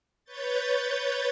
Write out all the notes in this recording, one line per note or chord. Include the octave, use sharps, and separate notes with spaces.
B4 C#5 G6 A6